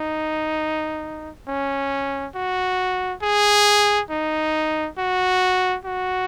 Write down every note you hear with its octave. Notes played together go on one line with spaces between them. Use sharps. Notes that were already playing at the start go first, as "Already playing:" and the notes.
Already playing: D#4
C#4
F#4
G#4
D#4
F#4
F#4